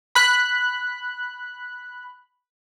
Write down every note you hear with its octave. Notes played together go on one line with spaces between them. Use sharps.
B5 F#6